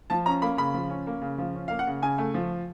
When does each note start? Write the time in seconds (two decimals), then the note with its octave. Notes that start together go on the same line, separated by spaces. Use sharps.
0.10 F3 A5
0.26 C#4 A#5
0.42 A#3 B5
0.57 C#3 B5
0.74 F3
0.90 C#4
1.07 A#3
1.22 C#3
1.38 F3
1.55 C#4
1.68 A#3 F5
1.79 F#5
1.87 C#3
2.02 C#3 G#5
2.18 A3
2.34 F3